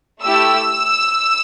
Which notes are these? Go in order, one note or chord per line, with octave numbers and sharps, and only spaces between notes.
A3 E4 G4 E6